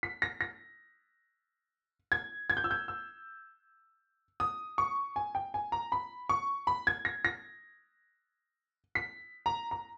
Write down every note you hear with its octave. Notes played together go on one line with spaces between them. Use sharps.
B6
A#6
A#6
G#6
G#6
G6
E6
G6
E6
D#6
C#6
G#5
G5
G#5
A#5
B5
C#6
B5
G#6
A#6
A#6
B6
A#5
A#5